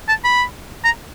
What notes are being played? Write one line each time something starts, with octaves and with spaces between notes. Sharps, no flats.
A5
B5
A#5